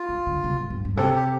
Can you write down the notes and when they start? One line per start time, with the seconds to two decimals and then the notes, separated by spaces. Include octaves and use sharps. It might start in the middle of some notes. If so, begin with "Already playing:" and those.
Already playing: F4
0.09 F3
0.27 D3
0.44 C3
0.57 A2
0.70 G2
0.85 G2
0.97 C3 A4
1.16 G4